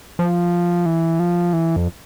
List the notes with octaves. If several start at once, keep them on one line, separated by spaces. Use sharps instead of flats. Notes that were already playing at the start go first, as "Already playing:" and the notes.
F3
E3
F3
E3
F2